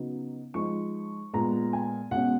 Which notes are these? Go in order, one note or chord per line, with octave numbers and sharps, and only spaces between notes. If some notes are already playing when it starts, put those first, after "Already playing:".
Already playing: C#3 F#3 B3 D#4
F3 G#3 D#4 C#6
A#2 G#3 B3 A#5
G#5
B2 G#3 C#4 F#5